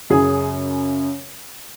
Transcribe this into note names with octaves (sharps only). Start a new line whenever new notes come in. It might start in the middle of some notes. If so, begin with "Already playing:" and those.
F#2 C#3 G#4